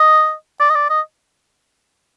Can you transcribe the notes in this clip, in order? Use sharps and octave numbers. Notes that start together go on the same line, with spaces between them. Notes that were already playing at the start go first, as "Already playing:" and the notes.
Already playing: D#5
D5
D#5
D5
D#5